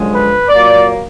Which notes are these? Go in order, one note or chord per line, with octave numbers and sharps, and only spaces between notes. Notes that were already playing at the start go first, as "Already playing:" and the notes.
Already playing: F#2 D3 F3 G#3
B4
A#2 F#3 A#3 D5